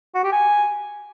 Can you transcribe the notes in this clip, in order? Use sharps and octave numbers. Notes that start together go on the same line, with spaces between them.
F#4
G4
G#5